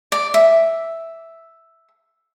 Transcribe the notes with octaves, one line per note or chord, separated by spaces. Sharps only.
D5
E5